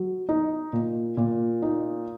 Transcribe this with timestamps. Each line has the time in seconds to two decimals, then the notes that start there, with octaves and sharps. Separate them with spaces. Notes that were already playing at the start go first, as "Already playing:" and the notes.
Already playing: F#3
0.29 D#4
0.73 A#2
1.17 A#2
1.62 D#4